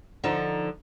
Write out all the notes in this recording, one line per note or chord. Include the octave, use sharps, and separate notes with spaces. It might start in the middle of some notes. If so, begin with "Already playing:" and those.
D3 F3 D#4